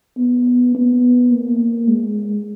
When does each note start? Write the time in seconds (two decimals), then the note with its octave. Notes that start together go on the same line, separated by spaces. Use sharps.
0.17 B3
0.75 B3
1.31 A#3
1.88 G#3